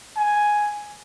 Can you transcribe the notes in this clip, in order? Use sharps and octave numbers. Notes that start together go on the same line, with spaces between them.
G#5